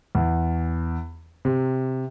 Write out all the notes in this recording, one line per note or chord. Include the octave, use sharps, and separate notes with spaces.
E2
C3